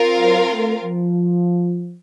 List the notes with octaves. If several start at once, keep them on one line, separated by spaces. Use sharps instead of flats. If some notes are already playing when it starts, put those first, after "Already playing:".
Already playing: C4 F4 A#4 F5
F#3
A3
F3